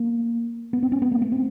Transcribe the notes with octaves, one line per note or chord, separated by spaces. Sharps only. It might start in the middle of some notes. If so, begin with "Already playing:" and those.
Already playing: A#3
B3
C4
C#4
B3
A#3
A3
C4